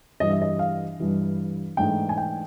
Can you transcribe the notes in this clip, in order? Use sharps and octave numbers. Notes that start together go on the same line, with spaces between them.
G2 E3 G3 D#5
E5
D#5
F5
G2 E3 G3
G#2 E3 A3 D4 G5
G#5
G5